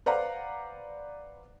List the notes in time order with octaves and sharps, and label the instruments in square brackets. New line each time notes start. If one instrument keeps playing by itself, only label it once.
[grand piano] B4 C5 D5 F5 F#5 A#5